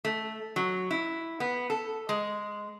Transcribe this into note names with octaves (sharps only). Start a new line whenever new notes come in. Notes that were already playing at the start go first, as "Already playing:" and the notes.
A3
F#3
E4
B3
A4
G#3